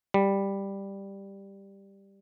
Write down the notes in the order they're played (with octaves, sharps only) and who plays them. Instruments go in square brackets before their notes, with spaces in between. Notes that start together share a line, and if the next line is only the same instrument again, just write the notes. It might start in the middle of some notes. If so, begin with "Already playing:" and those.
[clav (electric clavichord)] G3